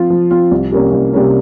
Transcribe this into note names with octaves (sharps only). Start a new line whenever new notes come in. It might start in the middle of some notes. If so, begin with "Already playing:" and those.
Already playing: F3 C4 F4
F3
C4 F4
C2
C3 G3 A#3 C#4
C2
C3 G3 A#3 C#4